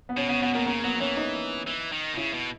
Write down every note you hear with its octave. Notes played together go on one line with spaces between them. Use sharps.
B3
B2 C#4
C#3 B3
B2 B3
B2 A#3
C#3 A#3
F#3 B3
B3
E3 C#4
D#4
E3
D#3
B2
C#3 E4
B2